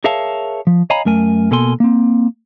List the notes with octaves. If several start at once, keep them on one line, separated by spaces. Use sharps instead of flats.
G#4 A#4 C#5 E5 F5 A5
F3
C#5 D#5 F5 G#5 A#5 B5
F#2 A3 A#4 G#5
B2 A#3 A4 G#5 C6
A#3 C4